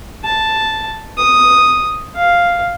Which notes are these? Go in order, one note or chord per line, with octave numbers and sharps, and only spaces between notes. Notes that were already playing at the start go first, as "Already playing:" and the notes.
A5
D#6
F5